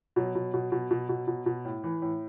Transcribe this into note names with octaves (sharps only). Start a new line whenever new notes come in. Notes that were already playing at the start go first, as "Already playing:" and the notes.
B2 F#3
B2
B2
B2
B2
B2
B2
B2
A2
E3
A2